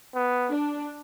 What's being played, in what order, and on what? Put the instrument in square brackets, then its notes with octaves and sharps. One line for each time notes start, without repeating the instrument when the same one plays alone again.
[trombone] B3
[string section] D4